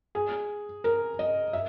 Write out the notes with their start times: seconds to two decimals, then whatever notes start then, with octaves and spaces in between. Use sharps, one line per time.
0.15 G#4
0.84 A#4
1.19 D#5
1.53 E5